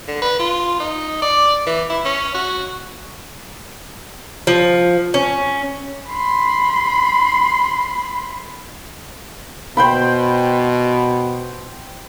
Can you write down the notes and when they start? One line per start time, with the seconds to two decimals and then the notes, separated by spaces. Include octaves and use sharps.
0.08 D3
0.22 B4
0.39 F4
0.80 D#4
1.22 D5
1.66 E3
1.90 E4
2.05 C#4
2.35 F#4
4.47 F3
5.14 C#4
6.10 B5 C6
9.77 B2 C5 G5 B5